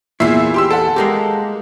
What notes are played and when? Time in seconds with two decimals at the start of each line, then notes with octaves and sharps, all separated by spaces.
0.20 E2 A#2 E4 E5 C7
0.54 G4 C6 E6
0.71 A4 F#5
0.96 G#3 A#3 G4